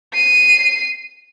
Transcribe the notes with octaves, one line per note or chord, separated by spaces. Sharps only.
C7 D#7